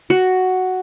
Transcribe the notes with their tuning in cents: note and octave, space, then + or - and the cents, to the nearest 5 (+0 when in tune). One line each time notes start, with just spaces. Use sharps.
F#4 +5